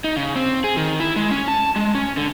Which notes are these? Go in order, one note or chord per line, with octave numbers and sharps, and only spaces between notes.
D#4
C#3
C4
G#4
D#3
E4
G#3
C#4
A5
G#3
C#4
D3